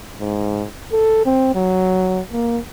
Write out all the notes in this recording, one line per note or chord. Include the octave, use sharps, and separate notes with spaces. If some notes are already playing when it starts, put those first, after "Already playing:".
G#2
A4
C4
F#3
A#3